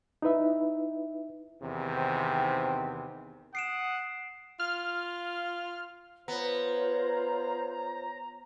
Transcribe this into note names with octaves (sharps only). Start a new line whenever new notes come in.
D#4 E4 B4 E5
E2 C3 D#3
C4
F#5 D#6 C7 D7 E7
F4 F6
B3 F4 C5 C#5 A#5